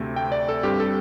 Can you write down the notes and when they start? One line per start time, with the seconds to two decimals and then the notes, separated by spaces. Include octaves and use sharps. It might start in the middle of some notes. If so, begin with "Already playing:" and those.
Already playing: D2 C3 A3 C4
0.16 G5
0.32 D5
0.49 A4
0.63 G2 G3 C4 G4
0.80 A4